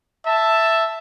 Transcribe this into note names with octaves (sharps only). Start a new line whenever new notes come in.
E5 A5